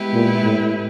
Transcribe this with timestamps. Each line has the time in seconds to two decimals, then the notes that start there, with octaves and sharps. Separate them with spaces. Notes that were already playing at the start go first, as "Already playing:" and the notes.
Already playing: G#3 B3 E4 G4 B4
0.14 A#2
0.44 A2